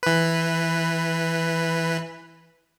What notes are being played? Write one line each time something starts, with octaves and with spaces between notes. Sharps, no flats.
E3 B4